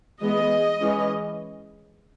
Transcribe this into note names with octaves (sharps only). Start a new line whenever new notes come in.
E3 G#3 B3 D#5
E3 G#3 C#4